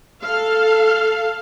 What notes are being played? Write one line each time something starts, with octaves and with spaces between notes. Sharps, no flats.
A4 F5